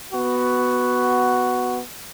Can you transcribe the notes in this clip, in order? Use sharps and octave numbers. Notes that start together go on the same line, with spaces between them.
B3 F#4